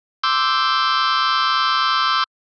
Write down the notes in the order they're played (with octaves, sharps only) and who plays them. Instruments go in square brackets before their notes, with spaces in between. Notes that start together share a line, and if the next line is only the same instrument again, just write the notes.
[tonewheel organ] C6 D6 E6 G6